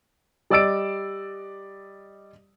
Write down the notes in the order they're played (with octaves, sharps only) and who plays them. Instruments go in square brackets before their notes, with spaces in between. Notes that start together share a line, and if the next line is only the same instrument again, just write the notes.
[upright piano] G3 D5 D#5 E6 A6 D7